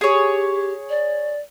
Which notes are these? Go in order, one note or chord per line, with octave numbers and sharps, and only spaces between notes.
G4 G#4 C#5
D5